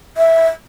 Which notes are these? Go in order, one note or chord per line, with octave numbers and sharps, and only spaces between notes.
E5